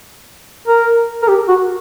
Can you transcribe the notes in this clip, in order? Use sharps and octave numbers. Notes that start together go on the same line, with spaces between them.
A#4
A#4
G4
F#4